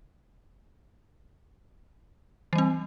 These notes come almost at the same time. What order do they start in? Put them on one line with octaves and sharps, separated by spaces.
E3 G3 C4